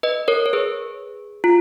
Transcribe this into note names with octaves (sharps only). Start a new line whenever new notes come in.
B4 D#5
A#4 C#5
C#5
G#4 B4
F4